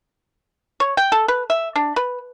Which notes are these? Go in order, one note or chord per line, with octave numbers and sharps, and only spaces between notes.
C#5
G5
A4
B4
E5
D4
B4